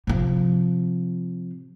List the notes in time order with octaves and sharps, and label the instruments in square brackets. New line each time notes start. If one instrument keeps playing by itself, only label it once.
[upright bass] C3 F3